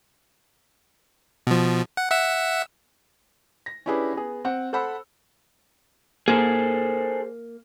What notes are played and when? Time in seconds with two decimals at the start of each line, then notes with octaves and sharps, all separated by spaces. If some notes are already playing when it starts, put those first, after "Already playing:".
1.47 B2 F3
1.97 F#5
2.11 E5 F#5 E6
3.66 A#6
3.86 C#4 D4 E4 G4 G#4 B4
4.13 B3 G#4
4.45 C4 F#5
4.73 A4 C5 F#5 B5 E6
6.28 A#3 G#4 A4 C5